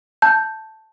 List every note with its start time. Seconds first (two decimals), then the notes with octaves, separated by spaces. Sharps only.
0.22 A5 G6